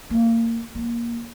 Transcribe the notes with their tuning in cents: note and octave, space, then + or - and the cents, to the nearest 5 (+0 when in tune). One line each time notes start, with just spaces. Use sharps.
A#3 -25
A#3 +15